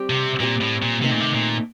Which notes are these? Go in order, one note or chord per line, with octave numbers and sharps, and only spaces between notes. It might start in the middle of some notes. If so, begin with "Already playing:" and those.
Already playing: G3 C4 G4
C3
A#2 G3 C4 G4
A2
A#2
C3 D#3 A3 C4 D#4
A#2
C3
A#2